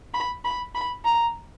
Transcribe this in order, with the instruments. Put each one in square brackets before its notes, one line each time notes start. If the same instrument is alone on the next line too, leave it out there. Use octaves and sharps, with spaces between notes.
[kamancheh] B5
B5
B5
A#5